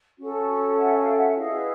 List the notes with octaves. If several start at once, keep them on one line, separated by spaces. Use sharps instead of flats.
C#4 F#4 A4
E5 F#5
F5 G5
E5 F#5
E4 G#4 B4 D#5 F5